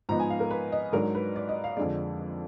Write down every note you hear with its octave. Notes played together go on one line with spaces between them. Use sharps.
G#2 F3 B3 D#4 A#5
G#5
F5
A#4
B4
D#5
G#2 F#3 D4 A#4
B4
D5
D#5
F5
F2 D3 G#3 D5